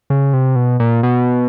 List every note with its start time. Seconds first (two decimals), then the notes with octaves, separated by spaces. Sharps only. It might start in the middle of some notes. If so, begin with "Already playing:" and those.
0.10 C#3
0.33 C3
0.56 B2
0.80 A#2
1.03 B2